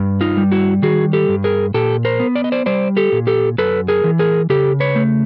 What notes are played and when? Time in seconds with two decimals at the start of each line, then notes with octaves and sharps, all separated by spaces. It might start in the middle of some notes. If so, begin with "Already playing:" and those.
Already playing: G2
0.21 D#4 F4
0.37 G3
0.52 E4 F#4
0.82 D#3 F#4 G#4
1.13 G4 A4
1.29 G2
1.44 G#4 A#4
1.74 A#2 G4 A4
2.05 A#4 C5
2.20 B3
2.36 D5
2.44 D#5
2.52 C5 D5
2.66 G3 C5 D5
2.97 G4 A4
3.12 A#2
3.27 G4 A4
3.58 F#2 A4 B4
3.88 G#4 A#4
4.04 E3
4.19 G#4 A#4
4.50 C#3 G4 A4
4.80 B4 C#5
4.95 A3